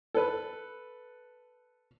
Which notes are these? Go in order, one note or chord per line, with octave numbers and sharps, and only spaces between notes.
A4 B4